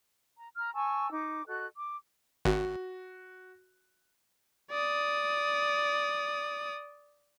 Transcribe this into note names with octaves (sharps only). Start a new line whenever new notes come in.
A#5
A#5 F6
G#5 A5 C#6 E6
D#4 D6
F#4 A4 D#5 F#6
D6
G#1 F#4
D5 D#6